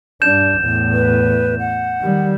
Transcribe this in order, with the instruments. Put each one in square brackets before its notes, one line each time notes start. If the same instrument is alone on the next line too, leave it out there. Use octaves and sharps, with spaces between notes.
[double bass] G2 D4 [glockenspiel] G6 E7
[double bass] E2 A2
[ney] B4
F#5
[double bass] D#3 G3